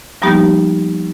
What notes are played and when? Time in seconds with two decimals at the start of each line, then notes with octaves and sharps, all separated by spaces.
0.22 F3 G3 A#3 B3 D#4 G4